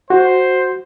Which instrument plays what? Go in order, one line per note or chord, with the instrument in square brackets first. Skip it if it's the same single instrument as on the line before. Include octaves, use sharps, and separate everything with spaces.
[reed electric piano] F#4 [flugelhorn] C5